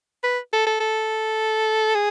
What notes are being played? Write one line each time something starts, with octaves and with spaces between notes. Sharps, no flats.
B4
A4
A4
A4
G#4